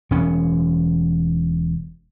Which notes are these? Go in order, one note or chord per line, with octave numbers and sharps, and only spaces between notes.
E1 C#4